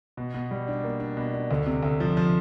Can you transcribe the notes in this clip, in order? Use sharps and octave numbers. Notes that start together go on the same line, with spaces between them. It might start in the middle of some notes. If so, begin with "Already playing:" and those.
B2
B2
G3
D4
A#3
D4
B2
D4
D2
C3
D2
F3
F3